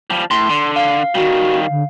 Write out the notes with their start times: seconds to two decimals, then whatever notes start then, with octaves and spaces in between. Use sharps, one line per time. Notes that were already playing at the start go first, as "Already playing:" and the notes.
0.10 F3 G3
0.31 A2 C6
0.50 D3
0.76 F5
1.15 D#3 G3 F#4
1.70 D3